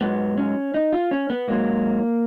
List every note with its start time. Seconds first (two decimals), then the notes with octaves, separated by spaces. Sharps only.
0.01 G#2 F#3 B3
0.38 C#4
0.74 D#4
0.93 F4
1.11 C#4
1.30 B3
1.48 G#2 F#3 A#3